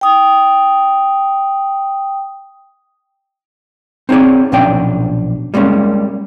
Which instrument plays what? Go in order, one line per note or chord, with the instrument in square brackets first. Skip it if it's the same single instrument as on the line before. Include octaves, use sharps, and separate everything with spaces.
[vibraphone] G5 D#6
[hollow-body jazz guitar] C4 D#4 G#4 C#5 D5
B1 A#2 F3 C#4 D4 G5
G3 G#3 A#3 C#4